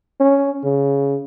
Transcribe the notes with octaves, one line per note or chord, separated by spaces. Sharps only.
C#4
C#3